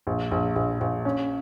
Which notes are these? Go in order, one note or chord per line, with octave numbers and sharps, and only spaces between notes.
A#1
A#1
A#1
A#1
C#4